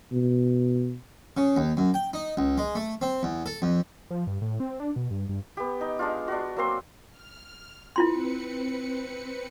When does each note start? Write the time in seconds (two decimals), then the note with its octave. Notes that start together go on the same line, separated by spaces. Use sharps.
0.13 B2
1.37 C#3
1.57 D#2
1.77 F#2
1.94 G5
2.14 D#4
2.37 C#2
2.58 G#3
2.75 A3
3.02 C4
3.23 E2
3.46 A4
3.62 F2
4.11 F3
4.27 G2
4.42 A2
4.60 C4
4.80 D4
4.96 B2
5.11 G2
5.29 G2
5.57 B3 G4
5.81 D#4
5.99 G#3 D4 F4
6.28 D4 F#4
6.57 F#3 A#3 C4 C6
7.09 F6
7.96 C4 E4 F4 B4 C6 C#7